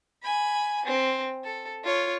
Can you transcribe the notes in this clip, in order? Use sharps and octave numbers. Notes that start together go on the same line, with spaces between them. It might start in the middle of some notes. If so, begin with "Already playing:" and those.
G#5 B5
C4
A4
F4 C#5